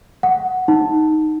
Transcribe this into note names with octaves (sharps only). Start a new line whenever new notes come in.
F#5
D#4